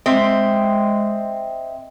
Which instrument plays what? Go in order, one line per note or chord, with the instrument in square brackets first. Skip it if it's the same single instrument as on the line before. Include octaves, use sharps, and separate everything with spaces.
[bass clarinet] G#3 [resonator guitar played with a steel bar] C4 [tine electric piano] D#5 E5 C6